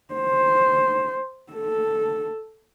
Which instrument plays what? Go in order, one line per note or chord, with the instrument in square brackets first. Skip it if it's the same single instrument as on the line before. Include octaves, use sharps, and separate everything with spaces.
[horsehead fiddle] C5
A4